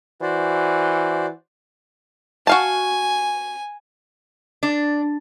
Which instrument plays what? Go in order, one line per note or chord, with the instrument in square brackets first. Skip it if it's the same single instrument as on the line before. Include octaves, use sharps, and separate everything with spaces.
[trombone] E3 [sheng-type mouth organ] F#4 C5 D5
[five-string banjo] F#4 F5 A5 [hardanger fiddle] G#5
[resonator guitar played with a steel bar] D4